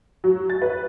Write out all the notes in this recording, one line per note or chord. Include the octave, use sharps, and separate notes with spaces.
F#3
A6
B4